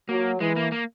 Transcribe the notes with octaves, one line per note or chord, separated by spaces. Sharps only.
F#3 A#3
E3 G#3
A#3
A#3